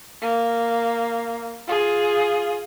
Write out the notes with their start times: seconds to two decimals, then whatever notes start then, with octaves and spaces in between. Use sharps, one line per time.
0.21 A#3
1.67 F4 G#4